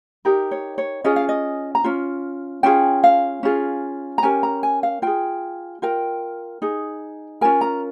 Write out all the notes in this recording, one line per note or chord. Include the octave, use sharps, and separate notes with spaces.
D#4 G4 A#4
C#5
C#5
C#4 F4 G#4 D#5
F5
D#5
A#5
C#4 F4
C#4 F4 G#4 G5
F5
C#4 F4 G#4
A#5
C#4 G4 A#4 G#5
A#5
G#5
F5
F4 G#4 G5
F4 A#4 G5
D#4 G#4
C#4 F4 A#4 G#5
A#5